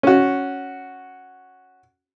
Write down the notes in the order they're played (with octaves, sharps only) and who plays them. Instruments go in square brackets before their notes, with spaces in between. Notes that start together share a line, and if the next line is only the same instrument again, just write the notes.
[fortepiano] C#4 F#4